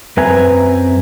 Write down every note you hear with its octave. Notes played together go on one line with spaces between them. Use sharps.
F#2 C4 B4 E5 G#5 A#5